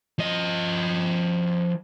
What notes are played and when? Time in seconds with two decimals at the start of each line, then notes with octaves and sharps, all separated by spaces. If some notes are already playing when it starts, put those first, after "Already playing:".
0.19 F3 D#5